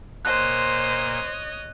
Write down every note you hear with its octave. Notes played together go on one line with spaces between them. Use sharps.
A#2 C5 C#5 D#5 F#6